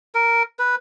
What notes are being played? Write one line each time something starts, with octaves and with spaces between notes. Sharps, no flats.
A#4
B4